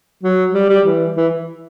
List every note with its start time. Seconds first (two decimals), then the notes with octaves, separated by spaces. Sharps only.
0.23 F#3
0.54 G3
0.70 G3
0.85 E3
1.16 E3